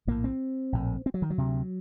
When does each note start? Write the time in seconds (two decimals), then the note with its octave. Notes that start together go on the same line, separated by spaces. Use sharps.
0.07 A#1 A2 A#3
0.24 C4
0.72 A#1 A2
1.06 C4
1.14 F#3
1.22 D#3
1.30 F#3
1.38 D2 C3